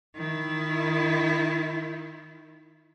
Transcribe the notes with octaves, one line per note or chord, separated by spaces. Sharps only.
D#3 E4